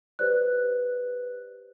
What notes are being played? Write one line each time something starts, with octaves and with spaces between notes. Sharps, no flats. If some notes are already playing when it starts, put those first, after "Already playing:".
G4 B4 C5 D5 F#6